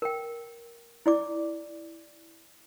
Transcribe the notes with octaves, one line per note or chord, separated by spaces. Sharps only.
A#4 G5
E4 D5 D6